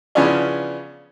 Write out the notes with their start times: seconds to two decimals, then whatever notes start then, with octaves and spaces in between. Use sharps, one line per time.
0.15 C#3 E3 F3 B3 C#4 D4